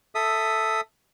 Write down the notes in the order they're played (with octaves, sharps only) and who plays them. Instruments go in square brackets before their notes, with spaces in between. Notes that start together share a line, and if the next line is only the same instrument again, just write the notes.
[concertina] A4 E5 D#6